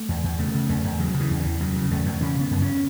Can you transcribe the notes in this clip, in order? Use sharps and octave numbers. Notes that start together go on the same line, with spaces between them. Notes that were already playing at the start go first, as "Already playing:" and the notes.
Already playing: A3
E2
E2
C#3 A3
C#3
E2 A3
E2
C#3 F#3
C#3
E3
E2
E3
E2
C#3 F#3
C#3
E2 A3
E2
C#3 C#4
C#3 B3
F#2
C#4